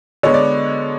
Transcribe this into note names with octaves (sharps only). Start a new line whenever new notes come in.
D3 G#3 B3 C#5
D5